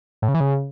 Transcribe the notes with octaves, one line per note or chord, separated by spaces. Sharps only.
A2
C#3
E3
C#3